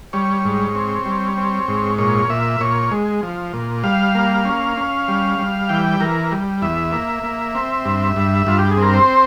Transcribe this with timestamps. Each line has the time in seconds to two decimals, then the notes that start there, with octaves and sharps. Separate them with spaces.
0.13 G3 C#5
0.45 G#2
0.75 C4
1.06 G3
1.37 C4
1.68 G#2
1.98 A#2 C#5
2.29 A#2 E5
2.60 A#2 C#5
2.91 G#3
3.23 F3
3.54 A#2
3.84 G3 F5
4.15 A#3
4.45 C#4
4.77 C#4
5.08 G3
5.39 G3
5.69 E3 G5
6.00 E3 A#4
6.32 G3
6.62 E2 E5
6.92 A#3
7.23 A#3
7.55 C4
7.85 G2
8.16 G2
8.46 G2 F4
8.59 G4
8.71 G#4
8.77 C4
8.82 A#4
8.94 C5